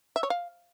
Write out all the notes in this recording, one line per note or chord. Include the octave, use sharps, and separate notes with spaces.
E5
C#5
F5